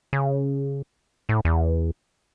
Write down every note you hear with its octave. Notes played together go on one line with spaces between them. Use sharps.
C#3
A2
E2